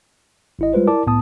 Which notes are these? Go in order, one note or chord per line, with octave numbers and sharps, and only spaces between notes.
G#1 E4 D#5
G3 G#3 F4 B4 C5
E4 A#4 D5 A5 D6
C2 A2 B3 A5 D#6